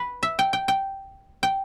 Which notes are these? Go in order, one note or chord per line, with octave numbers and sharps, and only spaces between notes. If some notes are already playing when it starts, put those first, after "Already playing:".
Already playing: B4
E5
G5
G5
G5
G5